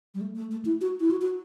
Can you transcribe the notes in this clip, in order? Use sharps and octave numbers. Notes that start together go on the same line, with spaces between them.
G3
A3
A3
A3
E4
F#4
E4
F#4
F#4